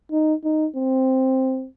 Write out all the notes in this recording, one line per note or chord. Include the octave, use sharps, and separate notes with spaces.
D#4
D#4
C4